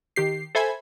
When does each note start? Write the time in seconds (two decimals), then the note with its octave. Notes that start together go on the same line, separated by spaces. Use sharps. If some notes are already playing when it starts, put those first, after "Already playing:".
0.16 D#3 G4 C7
0.55 A4 C5 E5 G#5 B5 G#6